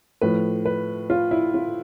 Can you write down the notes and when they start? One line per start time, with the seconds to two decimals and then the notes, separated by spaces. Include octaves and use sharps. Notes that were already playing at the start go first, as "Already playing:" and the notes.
0.21 A2 F3 B4
0.65 B4
1.10 F4
1.31 E4
1.54 F4